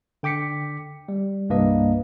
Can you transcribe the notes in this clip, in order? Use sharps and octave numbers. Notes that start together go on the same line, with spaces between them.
D3 G5 D6 B6 C#7
G3
C2 G2 A#3 D4 B4 D#5